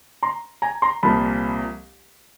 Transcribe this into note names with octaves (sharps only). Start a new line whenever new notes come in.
A#5 C6
G#5 A#5
A#5 C6
C2 A#2 F3 A#3 A5 B5